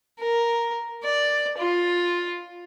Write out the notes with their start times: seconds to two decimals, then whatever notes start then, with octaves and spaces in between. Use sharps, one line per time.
0.20 A#4
1.04 D5
1.58 F4